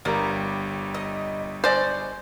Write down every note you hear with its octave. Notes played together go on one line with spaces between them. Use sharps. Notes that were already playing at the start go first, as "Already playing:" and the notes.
G1 G3 A#3 A#5
D#5
G#3 C5 D5